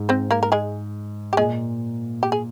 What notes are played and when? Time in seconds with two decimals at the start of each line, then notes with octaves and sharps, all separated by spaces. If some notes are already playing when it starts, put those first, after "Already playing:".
Already playing: G#2
0.09 C4 C5
0.31 A#3 A#4
0.43 A#4
0.52 G#3 G#4
1.33 G4
1.37 A#2 G#3 G#4
2.23 G4
2.32 G#4